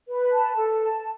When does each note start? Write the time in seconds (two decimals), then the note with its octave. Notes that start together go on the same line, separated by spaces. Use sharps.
0.09 B4
0.32 A5
0.56 A4
0.81 A5